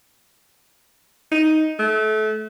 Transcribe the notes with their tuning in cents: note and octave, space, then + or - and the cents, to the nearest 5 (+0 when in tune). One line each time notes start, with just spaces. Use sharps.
D#4 +10
A3 -25